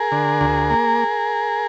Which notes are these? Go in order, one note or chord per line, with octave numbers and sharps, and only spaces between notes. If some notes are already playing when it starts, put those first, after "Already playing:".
Already playing: G#4 A#4
D3
D2
A#3